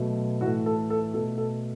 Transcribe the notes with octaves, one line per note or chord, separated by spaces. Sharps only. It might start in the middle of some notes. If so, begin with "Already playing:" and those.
Already playing: B2 F#3 A3
A2 E3 A3 F#4
A4
A4
B2 A3 A4
A4